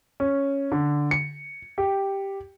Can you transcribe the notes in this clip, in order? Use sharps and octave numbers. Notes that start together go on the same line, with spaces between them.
C#4
D3
C#7
G4